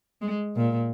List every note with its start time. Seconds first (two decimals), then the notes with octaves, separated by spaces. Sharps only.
0.22 G#3
0.56 A#2